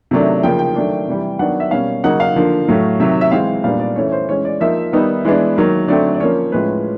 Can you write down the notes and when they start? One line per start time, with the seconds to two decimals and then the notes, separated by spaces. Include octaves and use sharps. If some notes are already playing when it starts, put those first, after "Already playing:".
0.11 C3 D#3 F#3 A3 D4
0.43 C#3 F3 A#3 G5
0.59 G5
0.76 D#3 F#3 A3 D4
1.08 C3 E3 G3
1.39 D#3 F#3 B3 D4 F#5
1.60 E5
1.71 B2 G3 A#3 C#4 F5
2.04 C#3 F#3 A#3 D#4 F#5
2.20 F5
2.36 D3 F3 A#3
2.68 A2 F#3 A3
3.00 C3 D#3 F#3 E5
3.21 E5
3.31 E3 G#3 C4 F5
3.64 A#2 G3 B3 D4 F5
3.80 D5
3.96 E3 A3 C#4 C#5
4.07 C#5
4.12 C5
4.28 E3 G#3 C#4 C#5
4.45 D5
4.60 F3 A#3 D#4 E5
4.93 D#3 G3 B3 D#4
5.25 E3 G#3 B3 D4
5.57 D#3 F#3 A#3
5.88 D3 F#3 A3 C4 D5
6.14 D5
6.20 F3 A#3 C#4 C#5
6.52 A2 F3 G#3 C#4 B4